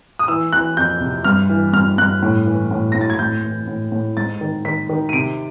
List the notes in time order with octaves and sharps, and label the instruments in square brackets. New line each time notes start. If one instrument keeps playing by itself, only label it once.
[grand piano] D#6
E3 E6
E3 F#6
F2 G6
C3
G2 F6
E3
G2 F6
G2 F#6
A2
E3
A2
A2 A#6
A6
G#6
A2 G6
E3
A2
A2
G#2 A6
D#3
D#3 B6
D#3
D#7
C3 D7